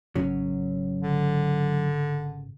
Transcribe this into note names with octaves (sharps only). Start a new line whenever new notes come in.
G#1 C#3 F#3 C#4
D3